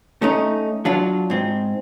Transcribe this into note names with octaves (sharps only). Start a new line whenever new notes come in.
A3 C#4 D#4
F#3 D4 F4
G#2 C4